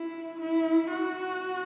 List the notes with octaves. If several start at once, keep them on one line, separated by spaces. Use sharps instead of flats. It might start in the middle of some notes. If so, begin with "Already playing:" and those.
Already playing: E4
E4
F#4